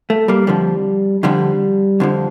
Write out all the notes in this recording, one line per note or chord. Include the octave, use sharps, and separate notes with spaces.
A3
G3 A#3
F2 D3 F3 G3
F2 D3 F3 G3
F2 D3 F3